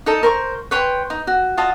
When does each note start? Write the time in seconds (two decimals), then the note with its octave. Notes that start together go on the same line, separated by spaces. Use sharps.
0.06 D#4 A4 D#5
0.23 A#4 C5 C#6
0.71 B4 C#5 G5 C6
1.10 D#4
1.27 F#4
1.57 F4 F#4 D#5 A5